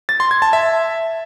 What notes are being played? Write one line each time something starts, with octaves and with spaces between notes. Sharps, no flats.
A6
C6
G#6
A5
E5